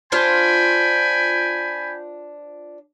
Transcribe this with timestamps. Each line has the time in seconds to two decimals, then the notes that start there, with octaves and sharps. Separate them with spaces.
0.12 D4 F4 C5 G5 G#5 B5